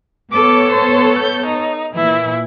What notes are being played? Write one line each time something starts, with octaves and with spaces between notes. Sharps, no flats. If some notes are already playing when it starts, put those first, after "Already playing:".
B3 A4 C#5 D6
C5
G6
D#4
A#2 E3 E4